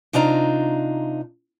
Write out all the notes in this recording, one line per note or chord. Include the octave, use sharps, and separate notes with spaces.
C3 D4 D#4 F4 A#5